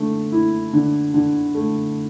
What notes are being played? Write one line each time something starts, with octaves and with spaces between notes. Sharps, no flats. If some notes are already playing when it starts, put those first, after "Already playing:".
Already playing: D3 A3
E4
D3
D3
A3